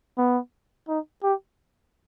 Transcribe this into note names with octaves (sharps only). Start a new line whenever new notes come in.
B3
D#4
G4